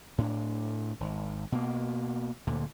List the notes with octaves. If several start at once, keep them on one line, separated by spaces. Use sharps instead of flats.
A2 D4
G#1
B2 A#3
D2 A#2 D3